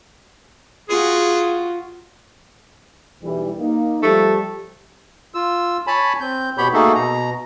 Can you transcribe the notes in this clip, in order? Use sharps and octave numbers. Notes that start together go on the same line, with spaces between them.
F4 F#4 G#4
B1 E3 G3
A#3 D#4
F3 G3 A3 G4
F4 E6
C#5 G#5 A5 B5
C4 G6
B2 B3 G4 C#5 B5 G6
A3 A#3 D#4 F#4 G#4 A4
B2 A#5